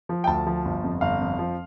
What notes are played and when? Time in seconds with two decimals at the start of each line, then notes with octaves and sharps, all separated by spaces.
0.09 F3
0.24 G5
0.27 D2 A5
0.47 F3
0.65 G1
0.84 F2
1.01 G1 F5
1.21 F2
1.39 F3